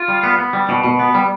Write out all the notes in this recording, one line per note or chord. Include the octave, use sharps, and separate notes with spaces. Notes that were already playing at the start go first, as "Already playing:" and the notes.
Already playing: F4
G3
B3
B3
G3
B2
B2
B3
G3